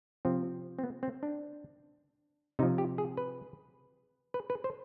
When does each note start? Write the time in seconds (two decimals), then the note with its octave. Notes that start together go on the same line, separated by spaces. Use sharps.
0.25 C3 F3 C4
0.79 C4
0.84 B3
1.03 C4
1.23 D4
2.59 C3 D#4
2.63 F3
2.78 G4
2.98 G#4
3.17 B4
4.34 B4
4.50 B4
4.64 C5